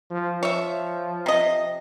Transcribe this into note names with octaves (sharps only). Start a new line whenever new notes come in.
F3
F3 C#5 E5
C3 D#5